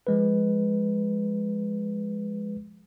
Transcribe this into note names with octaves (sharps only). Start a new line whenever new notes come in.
F3 G#3 B4